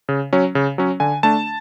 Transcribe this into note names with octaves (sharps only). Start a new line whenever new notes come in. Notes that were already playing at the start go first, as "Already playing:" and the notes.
C#3
F#3 C#4
C#3
F#3 C#4
D3 G#5
A3 D4 A5